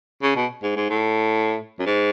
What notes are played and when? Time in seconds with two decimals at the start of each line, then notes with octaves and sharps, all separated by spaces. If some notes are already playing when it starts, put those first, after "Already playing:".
0.23 C#3
0.36 B2
0.63 G#2
0.76 G#2
0.90 A2
1.80 F#2
1.86 G#2